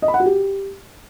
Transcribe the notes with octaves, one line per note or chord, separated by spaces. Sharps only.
D#5
B5
F#5
F#4
G4